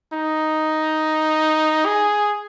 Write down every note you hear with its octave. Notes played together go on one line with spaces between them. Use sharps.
D#4
G#4